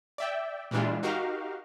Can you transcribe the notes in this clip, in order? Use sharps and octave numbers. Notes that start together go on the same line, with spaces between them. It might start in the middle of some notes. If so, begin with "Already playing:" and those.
D5 E5 G5
A#2 E3 G3 G#3 D4 F4
D#4 F#4 G4 A#4 F5